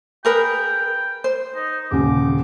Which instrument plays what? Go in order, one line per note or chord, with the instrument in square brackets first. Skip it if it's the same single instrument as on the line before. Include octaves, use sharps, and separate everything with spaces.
[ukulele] G#4 A#4 B4 [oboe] G5
[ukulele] C5
[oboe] D#4
[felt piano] D#1 C#3 [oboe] D6